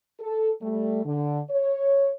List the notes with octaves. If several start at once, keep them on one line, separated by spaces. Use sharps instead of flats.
A4
G3 A3
D3
C#5